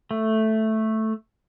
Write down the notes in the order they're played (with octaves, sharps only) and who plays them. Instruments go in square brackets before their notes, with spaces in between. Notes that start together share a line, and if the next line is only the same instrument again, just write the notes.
[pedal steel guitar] A3